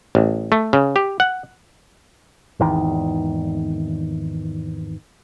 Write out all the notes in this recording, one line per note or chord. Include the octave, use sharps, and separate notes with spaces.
A1
A3
C#3
G4
F#5
G#1 E2 D#3